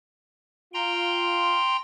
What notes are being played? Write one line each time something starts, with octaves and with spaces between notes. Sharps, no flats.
F4 G5 A#5 C6